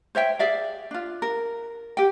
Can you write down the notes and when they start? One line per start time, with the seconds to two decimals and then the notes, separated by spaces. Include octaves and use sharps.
0.15 C5 C#5 E5 G5
0.39 G#4 D5 E5 F5
0.91 D4 F4
1.22 A#4
1.97 G4 G5